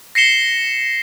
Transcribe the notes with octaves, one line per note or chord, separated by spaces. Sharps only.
A#6 C7 C#7 E7 G7